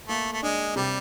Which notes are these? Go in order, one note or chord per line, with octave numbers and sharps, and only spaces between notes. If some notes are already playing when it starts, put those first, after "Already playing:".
A3 A#3
A3
G#3 D4
C3 G3